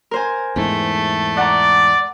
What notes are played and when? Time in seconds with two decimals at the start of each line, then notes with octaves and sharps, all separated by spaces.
0.11 A#4 C5 G#5
0.56 E2 G#2 A3
1.37 D5 F#5 A#5